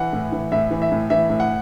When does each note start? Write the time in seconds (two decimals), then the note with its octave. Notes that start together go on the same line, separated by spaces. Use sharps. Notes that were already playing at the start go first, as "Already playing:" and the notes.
Already playing: E3 F#5
0.13 A2
0.32 E3
0.52 A2 E5
0.71 E3
0.82 E5
0.92 A2
1.10 E3 E5
1.30 A2
1.40 F#5